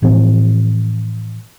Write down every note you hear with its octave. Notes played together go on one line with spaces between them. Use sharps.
A2 E3 F3 C4